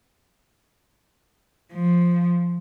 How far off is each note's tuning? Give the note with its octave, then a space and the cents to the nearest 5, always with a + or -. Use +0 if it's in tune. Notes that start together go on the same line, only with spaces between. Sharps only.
F3 +0